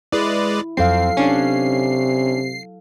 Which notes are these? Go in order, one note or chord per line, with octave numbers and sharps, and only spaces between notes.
G#3 E4 B4 D5
F2 F#3 C4 A4 F5 C7
C3 C#4 D4